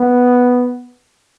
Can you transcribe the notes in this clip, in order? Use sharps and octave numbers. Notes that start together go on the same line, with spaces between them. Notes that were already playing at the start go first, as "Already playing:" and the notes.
Already playing: B3